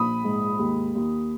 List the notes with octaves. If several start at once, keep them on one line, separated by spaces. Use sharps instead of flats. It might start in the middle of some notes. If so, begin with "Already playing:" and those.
Already playing: A#1 B5 D#6
G#2
D#2
D#2